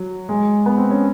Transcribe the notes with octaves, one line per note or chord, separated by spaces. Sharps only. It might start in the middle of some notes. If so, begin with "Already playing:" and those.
Already playing: F#3
G#3
B3
C4
C#4